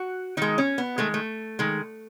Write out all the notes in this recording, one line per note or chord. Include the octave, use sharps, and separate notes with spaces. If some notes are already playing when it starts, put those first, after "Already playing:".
Already playing: F#4
D#3 G#3 D#4
C#4
B3
D#3 G#3 A3
A3
D#3 G#3